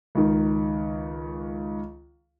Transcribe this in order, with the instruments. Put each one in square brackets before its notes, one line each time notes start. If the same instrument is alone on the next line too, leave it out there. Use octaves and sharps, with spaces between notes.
[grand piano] C#2 D#3